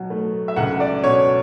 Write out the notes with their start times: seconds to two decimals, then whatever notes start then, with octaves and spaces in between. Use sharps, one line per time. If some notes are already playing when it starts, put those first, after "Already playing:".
Already playing: B2 F#3
0.10 A3
0.48 E5
0.56 C#2 F#5
0.80 D5
1.04 B2 C#5